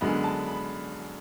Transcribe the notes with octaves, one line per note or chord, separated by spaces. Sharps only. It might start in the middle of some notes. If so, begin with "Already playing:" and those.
F#2 D3 G#3 B3 B5
A5
B5